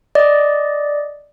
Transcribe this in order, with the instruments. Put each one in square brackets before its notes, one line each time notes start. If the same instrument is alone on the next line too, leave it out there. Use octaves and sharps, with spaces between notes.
[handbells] D5 D#5